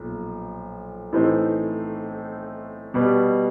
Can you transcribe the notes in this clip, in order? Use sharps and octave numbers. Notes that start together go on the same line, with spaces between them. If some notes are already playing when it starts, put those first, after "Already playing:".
Already playing: B1 A#2 F3
A2 E3 A3 C4 D#4
B2 G3 B3